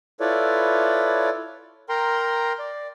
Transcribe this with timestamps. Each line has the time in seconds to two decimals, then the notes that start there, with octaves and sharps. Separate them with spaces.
0.20 E4 F4 A4 B4 C#5 D5
1.89 A#4 G5 A#5 C6
2.59 D5